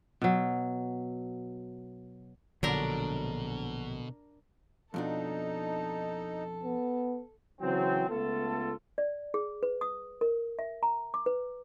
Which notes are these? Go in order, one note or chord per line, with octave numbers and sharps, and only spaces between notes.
B2 F#3
A#1 B2 D3 F#3 D4 A#4
F2 B2 D4 D#4 A4 A5
B3
C#3 E3 F#3 C4
C#2 A3 B3 F4 A4
D5
G#4
B4
D#6
A#4
E5
A#5
D6
B4